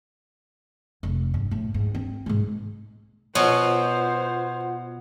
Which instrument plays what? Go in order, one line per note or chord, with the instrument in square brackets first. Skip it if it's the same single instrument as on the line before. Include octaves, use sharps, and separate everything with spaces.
[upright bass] F1
G2
A2
G#2
C4
G#2 G#3
[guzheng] B2 B3 [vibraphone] F4 F#5 [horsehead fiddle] C5 [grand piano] C#5